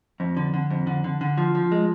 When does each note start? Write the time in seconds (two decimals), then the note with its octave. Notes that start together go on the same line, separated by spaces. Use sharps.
0.20 F2
0.37 D3
0.54 D3
0.70 F2
0.87 D3
1.04 D3
1.21 D3
1.38 F3
1.55 F3
1.72 G#3